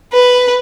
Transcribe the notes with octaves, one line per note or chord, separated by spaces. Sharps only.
B4